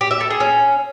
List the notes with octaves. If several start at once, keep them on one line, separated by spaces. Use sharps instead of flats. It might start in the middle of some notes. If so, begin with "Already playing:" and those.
G4
E5
A4
G#4
C#4